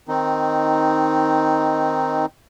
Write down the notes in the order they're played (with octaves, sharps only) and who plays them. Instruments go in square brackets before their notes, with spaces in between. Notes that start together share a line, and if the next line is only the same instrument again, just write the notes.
[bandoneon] D#3 C4 D#4